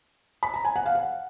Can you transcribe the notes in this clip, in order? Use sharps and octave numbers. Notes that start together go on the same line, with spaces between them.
B5
A#5
G#5
F#5
F5
F#5